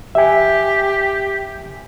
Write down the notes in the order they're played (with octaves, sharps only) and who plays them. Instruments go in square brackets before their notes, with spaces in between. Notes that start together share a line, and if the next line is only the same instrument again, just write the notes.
[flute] G4 [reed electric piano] E5 G#5